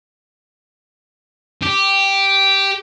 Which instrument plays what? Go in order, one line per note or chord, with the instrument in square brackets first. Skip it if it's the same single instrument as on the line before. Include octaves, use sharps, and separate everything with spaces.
[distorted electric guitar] G4